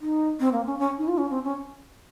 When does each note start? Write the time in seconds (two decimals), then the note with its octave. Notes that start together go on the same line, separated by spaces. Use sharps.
0.01 D#4
0.40 C4
0.53 A#3
0.66 C#4
0.79 C#4
0.98 D#4
1.08 F4
1.18 C#4
1.30 C4
1.44 C#4